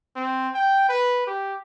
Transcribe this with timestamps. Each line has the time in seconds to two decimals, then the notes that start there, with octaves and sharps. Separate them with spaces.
0.16 C4
0.55 G5
0.89 B4
1.27 G4